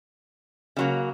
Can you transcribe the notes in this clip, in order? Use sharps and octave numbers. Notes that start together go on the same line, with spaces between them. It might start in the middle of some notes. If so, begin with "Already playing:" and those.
C#3 F#3 A#3